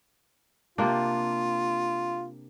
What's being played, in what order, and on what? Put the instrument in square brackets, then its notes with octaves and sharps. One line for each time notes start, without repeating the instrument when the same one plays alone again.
[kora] C3 A#3 D4 [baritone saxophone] F4